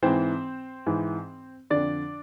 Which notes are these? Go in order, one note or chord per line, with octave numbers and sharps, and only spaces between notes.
G#2 E3 C4 C5
G#2 E3
F2 D3 D4 D5